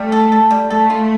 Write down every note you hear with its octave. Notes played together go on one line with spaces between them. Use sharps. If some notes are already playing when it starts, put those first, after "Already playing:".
Already playing: G3 A3
A4
A4
G3
A3 A4
F4